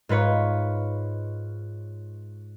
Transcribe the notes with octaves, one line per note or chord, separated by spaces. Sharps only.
G#2 F4 B4 C#5